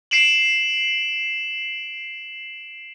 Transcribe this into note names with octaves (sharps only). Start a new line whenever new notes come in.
C7 D7 E7 F#7